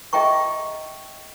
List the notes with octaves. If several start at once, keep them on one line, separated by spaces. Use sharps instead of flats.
G#4 D#5 E5 G5 A#5 C#6